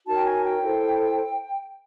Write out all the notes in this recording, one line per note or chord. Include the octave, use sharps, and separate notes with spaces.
D#4 F#4 A#4 C#5 A5
G5
G#5
G5
E4 A4 C5